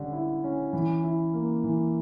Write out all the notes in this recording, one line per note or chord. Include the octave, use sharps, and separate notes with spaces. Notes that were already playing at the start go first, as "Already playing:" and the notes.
Already playing: D3 G3 C#4
E4
C#4
E3
E4
A#3
E3